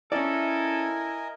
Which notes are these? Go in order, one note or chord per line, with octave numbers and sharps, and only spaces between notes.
C#4 E4 A4 A#4 D5 D#5 G#5